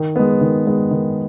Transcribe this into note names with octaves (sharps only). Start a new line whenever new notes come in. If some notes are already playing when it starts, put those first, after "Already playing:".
Already playing: D#3
G#3 B3
D#3
G#3 B3
D#3